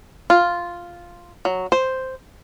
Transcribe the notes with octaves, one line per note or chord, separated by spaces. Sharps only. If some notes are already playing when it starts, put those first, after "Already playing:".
F4
F#3
C5